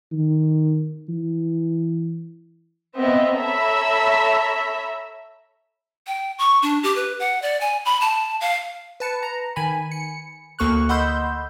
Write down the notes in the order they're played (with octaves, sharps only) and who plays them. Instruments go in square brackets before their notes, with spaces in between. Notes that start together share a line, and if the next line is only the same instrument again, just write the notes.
[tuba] D#3
E3
[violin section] B3 C4 D#5 E5
A4 C#5 E5 A#5 B5 E6
[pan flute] G5
C#6
D4
G4
B4
F#5
D5
G#5
B5
A5
F5
[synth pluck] B4 A5 C#7
A#5
D#3 G#5 B5
C#7
D2 A#3 A4 C#6 F6 F#6
D#5 F#5 B5 C6 E6 G6